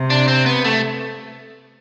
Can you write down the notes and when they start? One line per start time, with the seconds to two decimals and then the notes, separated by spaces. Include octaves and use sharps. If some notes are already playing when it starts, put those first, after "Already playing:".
Already playing: C3
0.10 D4
0.28 C4
0.46 B3
0.64 A3